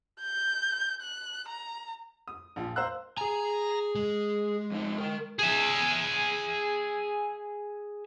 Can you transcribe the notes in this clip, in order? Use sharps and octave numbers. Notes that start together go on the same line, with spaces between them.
G6
F#6
A#5
D#6
A#1 F3
C5 F5 A#5 E6 F#6
G#4 G#5 A#5
G#3
F2 D#4
A#4 G5
G#4 E5